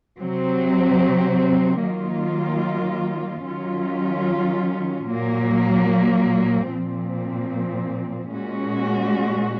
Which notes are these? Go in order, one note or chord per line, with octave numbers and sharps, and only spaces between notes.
C3 F#3 C4
D#3 F#3 A#3 F4
D#3 F#3 C#4 F4
A#2 F#3 A#3
A#2 F3 C4
A#2 G#3 C#4 F#4